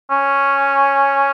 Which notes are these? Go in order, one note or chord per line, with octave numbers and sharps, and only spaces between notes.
C#4